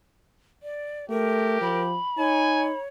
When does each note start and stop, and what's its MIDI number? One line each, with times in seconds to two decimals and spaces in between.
0.63 1.06 74
1.10 1.60 57
1.10 1.93 67
1.10 1.82 70
1.62 1.97 53
1.62 2.80 83
2.18 2.73 63
2.18 2.88 73
2.18 2.65 80